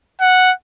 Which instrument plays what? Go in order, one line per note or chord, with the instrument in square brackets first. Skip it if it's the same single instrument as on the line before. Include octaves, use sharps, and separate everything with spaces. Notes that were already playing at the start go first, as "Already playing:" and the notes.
[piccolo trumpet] F#5